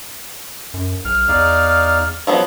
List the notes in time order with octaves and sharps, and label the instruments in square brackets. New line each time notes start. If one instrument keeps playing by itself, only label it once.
[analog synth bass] F#2
[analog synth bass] B1 [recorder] F6
[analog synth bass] E2 [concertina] D#4 D5 F5
[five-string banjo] F3 F#3 B3